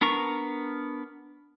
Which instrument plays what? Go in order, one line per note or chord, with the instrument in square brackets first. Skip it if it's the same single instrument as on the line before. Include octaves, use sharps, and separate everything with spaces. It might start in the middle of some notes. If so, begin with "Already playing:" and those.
[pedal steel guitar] B3 D4 A#4 A#5 C#6